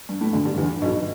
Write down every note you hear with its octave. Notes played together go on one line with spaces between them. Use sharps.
G2
A2
D2 D3
G2 G3
E2 E3
B1 B2